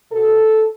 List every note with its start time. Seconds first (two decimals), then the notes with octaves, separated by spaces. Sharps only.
0.12 B2 A4